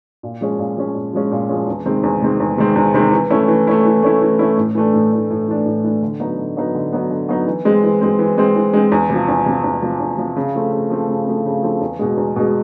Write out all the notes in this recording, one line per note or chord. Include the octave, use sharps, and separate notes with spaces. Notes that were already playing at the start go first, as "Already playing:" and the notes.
A#2
F3 G#3 C#4
A#2
F3 G#3 C#4
A#2
F3 G#3 C#4
A#2
F3 G#3 C#4
E2
C3 D#3 G#3 C4
E2
C3 D#3 G#3 C4
E2
C3 D#3 G#3 C4
E2
C3 D#3 G#3 C4
E3
A3 C#4 E4
E3
A3 C#4 E4
E3
A3 C#4 E4
E3
A3 C#4 E4
A2
E3 A3 D4
A2
E3 A3 D4
A2
E3 A3 D4
A2
E3 A3 D4
D3
F#3 B3 D#4
D3
F#3 B3 D#4
D3
F#3 B3 D#4
D3
F#3 B3 D#4
E3
G#3 C4
E3
G#3 C4
E3
G#3 C4
E3
G#3 C4
E2
C3 F3
E2
C3 F3
E2
C3 F3
E2
C3 F3
C#3
F3 A3 C4
C#3
F3 A3 C4
C#3
F3 A3 C4
C#3
F3 A3 C4
E2
B2 G#3
E2
B2 G#3